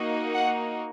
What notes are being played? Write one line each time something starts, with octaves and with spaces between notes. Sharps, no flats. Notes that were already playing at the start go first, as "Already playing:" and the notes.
Already playing: A#3 D#4 F#4
F#5